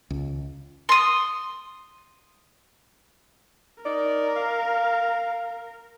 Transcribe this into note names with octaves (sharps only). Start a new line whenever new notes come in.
C#2
C6 D#6
D#4 A#4 D5
F5